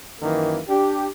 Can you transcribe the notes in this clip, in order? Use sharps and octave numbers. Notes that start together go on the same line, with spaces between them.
F#2 D#3 E3 A#3 A#4
D4 G4